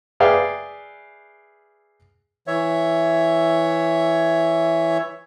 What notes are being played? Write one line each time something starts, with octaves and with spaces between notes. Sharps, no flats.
G#4 B4 D5 E5 F5 G5
E3 C#5 E5